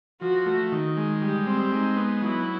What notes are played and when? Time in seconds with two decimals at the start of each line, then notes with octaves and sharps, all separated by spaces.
0.22 F3 F#4
0.46 A3
0.72 D#3
0.97 G#3
1.21 G3 G4
1.47 C4
1.71 G#3 D#4
1.96 B3
2.22 F#3 E4